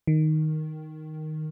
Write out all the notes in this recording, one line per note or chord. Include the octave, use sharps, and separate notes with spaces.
D#3